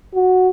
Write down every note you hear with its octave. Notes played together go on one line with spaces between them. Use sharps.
F#4